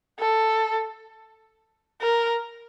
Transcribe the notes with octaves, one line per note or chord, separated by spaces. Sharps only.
A4
A#4